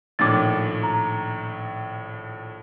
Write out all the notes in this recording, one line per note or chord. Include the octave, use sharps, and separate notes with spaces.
A#1 A2 D#3 D6 A6
A#5